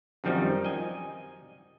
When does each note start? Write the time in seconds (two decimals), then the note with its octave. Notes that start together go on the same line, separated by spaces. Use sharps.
0.24 F#2 D#3 F3 G3 C4 D#4
0.64 D#5 G#5